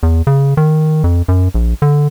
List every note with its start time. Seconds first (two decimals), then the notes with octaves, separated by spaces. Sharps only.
0.03 E2
0.27 C#3
0.57 D#3
1.04 F2
1.28 F#2
1.54 A#1
1.82 D3